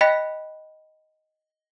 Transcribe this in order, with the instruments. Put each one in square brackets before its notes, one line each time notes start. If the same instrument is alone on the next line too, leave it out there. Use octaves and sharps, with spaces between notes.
[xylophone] D#5 G5 B5 F#6 A#6 B6